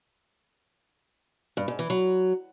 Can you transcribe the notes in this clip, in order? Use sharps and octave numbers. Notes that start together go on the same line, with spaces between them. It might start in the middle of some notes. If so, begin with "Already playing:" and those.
G2
G#2
E3
F#3